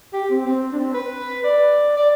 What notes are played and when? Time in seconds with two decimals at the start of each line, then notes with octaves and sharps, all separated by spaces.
0.13 G4
0.30 C4
0.46 C4
0.72 D4
0.78 C4
0.94 B4
1.44 D5
1.97 D5